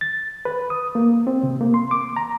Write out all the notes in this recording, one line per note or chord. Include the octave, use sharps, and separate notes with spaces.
A6
B4
D#6
A#3
C4
C3
A#3
C6
D6
A#5